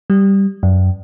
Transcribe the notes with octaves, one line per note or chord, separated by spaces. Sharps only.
G3
F#2